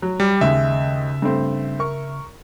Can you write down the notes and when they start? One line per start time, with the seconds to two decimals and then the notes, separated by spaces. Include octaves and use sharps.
0.02 F#3
0.20 G3
0.41 D#2 C#3 G#3 E5
1.22 G2 A3 C4
1.79 A#4 C#6